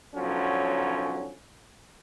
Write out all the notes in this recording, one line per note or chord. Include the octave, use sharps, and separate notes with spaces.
B1 D3 F3 F#3 C#4